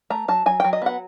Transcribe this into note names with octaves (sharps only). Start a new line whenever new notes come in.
A3 A#5
F#3 A5
F#3 G#5
F#3 G5
D#5
B3 F#5